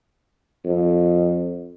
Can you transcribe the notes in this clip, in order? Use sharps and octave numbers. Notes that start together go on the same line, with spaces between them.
F2